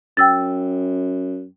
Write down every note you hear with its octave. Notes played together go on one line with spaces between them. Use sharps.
F#2 G5 E6 A6